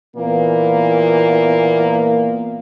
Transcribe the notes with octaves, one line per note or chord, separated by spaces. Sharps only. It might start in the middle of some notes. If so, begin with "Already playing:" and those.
A#2 E3 A#3 B3